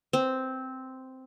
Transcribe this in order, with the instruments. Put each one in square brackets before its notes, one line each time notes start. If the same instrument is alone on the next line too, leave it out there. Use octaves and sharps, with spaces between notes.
[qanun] C4